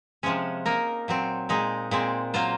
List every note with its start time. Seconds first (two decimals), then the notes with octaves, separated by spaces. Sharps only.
0.23 C3 F3 G#3 C#4
0.65 A#3 D#4 A#4
1.08 A#2 F#3 C4
1.49 A#2 G#3 D#4
1.91 A#2 G#3 C4
2.34 F#3 A#3 F4 C5